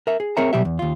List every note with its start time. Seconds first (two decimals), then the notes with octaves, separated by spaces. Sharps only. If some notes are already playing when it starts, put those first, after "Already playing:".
0.07 A#4 E5
0.20 G#4
0.37 C4 G#4 A#4 C#5 E5 A#5
0.53 B2 F#3 G3 G4 E5
0.65 E2
0.79 D#2 F4